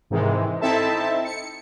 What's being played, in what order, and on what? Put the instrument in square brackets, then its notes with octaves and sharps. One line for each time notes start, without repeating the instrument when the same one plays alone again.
[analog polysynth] G#2 C3 D#3 E3 G#3
C4 D#4 E4 A4 E5 A5
C#7